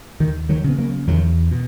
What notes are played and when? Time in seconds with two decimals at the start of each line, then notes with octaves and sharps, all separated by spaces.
0.20 D#2 D#3
0.49 D#3 F#3
0.64 C#3
0.69 B3
0.78 F#3 A#3
1.07 E2 D#3 F#3
1.51 B2